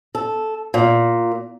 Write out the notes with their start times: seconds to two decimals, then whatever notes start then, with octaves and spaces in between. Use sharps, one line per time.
0.15 A4
0.74 A#2